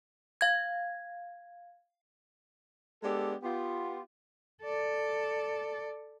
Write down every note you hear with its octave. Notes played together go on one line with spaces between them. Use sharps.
F5 G#6
G#3 B3 D4 G4 A4
B3 F4 G4
A4 D5